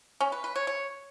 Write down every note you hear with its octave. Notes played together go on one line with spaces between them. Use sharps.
C#4
B4
B4
C#5
C#5